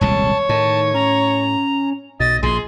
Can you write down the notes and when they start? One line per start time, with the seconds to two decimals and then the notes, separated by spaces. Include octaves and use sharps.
0.01 D#1 C2 G#3 C#5 A5
0.49 A2 D#3 A5
0.94 C#4 A#5
2.20 B1 B2 D#5 A6
2.43 A#1 A#2 G#4 C6